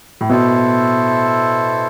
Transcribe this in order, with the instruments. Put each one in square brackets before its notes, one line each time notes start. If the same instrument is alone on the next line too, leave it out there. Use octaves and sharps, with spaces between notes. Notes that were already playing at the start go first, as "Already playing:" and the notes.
[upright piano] A2
[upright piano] B2 [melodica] E4 A4 C5